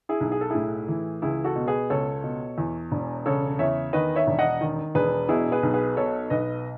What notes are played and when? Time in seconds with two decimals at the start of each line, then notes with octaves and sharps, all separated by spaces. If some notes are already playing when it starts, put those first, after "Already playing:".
0.09 E4 G#4
0.20 B1
0.32 G#4
0.41 A4
0.50 A2 E4 G#4
0.88 E3
1.22 C#2 E4 G#4
1.44 F#4 A4
1.56 B2
1.67 G#4 B4
1.90 C#2 A4 C#5
2.24 B2
2.58 E2
2.92 E1
3.26 C#3 A4 C#5
3.59 E2 C#5 E5
3.93 D#3 B4 D#5
4.16 C#5 E5
4.27 E1
4.39 D#5 F#5
4.61 D#3
4.95 E1 G#4 B4
5.29 B2 E4 G#4
5.52 G#4 B4
5.63 B1
5.74 G#4 B4
5.97 B2 A4 C#5
6.30 B1 B4 D#5